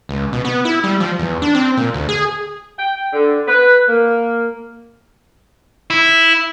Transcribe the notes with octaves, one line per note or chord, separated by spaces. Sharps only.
C#2
B2
B3
E4
G3
F3
E2
D4
C4
A#2
D2
G#4
G5
D3
B4
A#3
E4